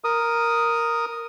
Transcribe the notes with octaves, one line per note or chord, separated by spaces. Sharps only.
A#4 D#6